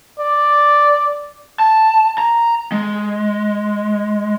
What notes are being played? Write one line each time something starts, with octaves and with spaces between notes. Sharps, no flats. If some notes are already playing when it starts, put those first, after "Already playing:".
D5
A5
A#5
G#3